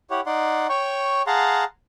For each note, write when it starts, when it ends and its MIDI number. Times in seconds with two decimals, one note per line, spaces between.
0.11 0.21 64
0.11 0.21 67
0.11 0.21 73
0.11 0.21 78
0.26 0.67 63
0.26 0.67 74
0.26 0.67 78
0.26 0.67 84
0.69 1.22 73
0.69 1.22 79
0.69 1.22 85
1.27 1.64 68
1.27 1.64 77
1.27 1.64 78
1.27 1.64 81
1.27 1.64 82
1.27 1.64 84